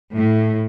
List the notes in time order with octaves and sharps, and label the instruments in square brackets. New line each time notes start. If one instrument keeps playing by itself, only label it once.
[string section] A2